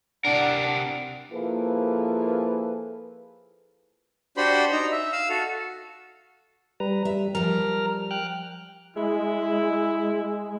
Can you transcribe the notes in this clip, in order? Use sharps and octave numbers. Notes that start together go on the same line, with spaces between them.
C3 D4 A#4 F#5
F3 A#3 E4 G#4 A4 B4
D4 F#4 G4 C5 B5 C6
D#4 A#5
E5
F5 E6
F#4 A4
G3 B4 A#5
G3 E5
F3 G3 A#4 A#5 F6
G5 F6 F#6
G#3 E4